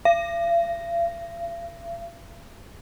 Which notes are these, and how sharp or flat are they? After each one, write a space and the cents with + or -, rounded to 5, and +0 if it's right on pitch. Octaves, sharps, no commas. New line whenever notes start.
F5 -45